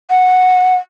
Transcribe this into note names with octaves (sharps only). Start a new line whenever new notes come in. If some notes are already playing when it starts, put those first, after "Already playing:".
F#5